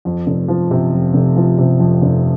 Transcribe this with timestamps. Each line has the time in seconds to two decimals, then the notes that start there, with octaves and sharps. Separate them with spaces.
0.05 F2
0.27 F1
0.48 F3
0.71 C3
0.92 F2
1.14 F1
1.36 F3
1.58 C3
1.80 F2
2.02 F1